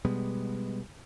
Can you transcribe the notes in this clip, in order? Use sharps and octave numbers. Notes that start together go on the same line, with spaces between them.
B2 G3 G#3 B3